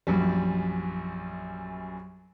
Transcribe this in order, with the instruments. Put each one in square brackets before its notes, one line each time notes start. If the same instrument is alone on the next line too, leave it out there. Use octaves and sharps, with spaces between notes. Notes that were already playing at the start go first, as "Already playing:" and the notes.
[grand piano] A#1 F#2 G3